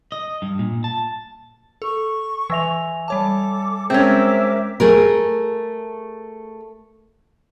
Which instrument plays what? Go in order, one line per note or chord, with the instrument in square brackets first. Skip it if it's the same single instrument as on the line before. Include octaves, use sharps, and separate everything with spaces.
[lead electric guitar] D#5
G2
A#2
A5
[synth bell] A4 [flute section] C#6
[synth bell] E3 A#6 F7 [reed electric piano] E5 G#5 E6
[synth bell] G3 C#5 A5 [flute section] A4 D6
[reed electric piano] G#3 G#6 [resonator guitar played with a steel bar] C4 C#4 [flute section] A#4 E5 D6
[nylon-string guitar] A3 G#4 A#4